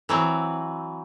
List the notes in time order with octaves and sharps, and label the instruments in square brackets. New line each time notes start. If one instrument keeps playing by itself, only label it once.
[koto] E3 F#3 C4